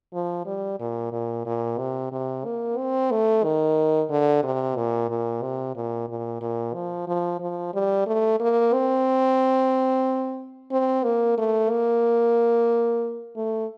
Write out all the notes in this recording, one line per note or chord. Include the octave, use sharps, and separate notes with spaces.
F3
G3
A#2
A#2
A#2
C3
C3
A#3
C4
A3
D#3
D3
C3
A#2
A#2
C3
A#2
A#2
A#2
F3
F3
F3
G3
A3
A#3
C4
C4
A#3
A3
A#3
A3